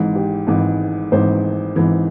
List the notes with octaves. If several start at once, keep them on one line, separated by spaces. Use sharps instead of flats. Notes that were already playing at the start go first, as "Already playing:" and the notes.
Already playing: G#1 G#2 E3
G4
G#1 G#2 E3
G#1 G#2 E3 C5
G#1 G#2 E3